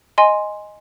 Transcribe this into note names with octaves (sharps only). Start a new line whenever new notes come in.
D#5 G#5 C6